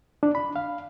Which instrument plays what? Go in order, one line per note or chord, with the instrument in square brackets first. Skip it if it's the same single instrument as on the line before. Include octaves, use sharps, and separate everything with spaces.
[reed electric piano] D4
B5
F5